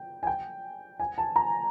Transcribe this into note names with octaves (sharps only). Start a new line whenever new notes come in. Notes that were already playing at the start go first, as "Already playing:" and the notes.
Already playing: G5
G#5
G5
G#5
A5
A#5